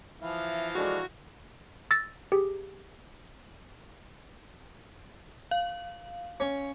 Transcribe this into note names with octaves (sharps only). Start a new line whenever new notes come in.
E3 F3 E5 F5
G#3 D4 F#4 A4
E6 A6 A#6
G4 G#4
F5
C#4